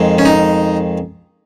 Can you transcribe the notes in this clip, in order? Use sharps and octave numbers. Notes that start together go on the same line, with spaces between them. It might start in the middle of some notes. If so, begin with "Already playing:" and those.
Already playing: F2 D#3 G#3
C#4
D#4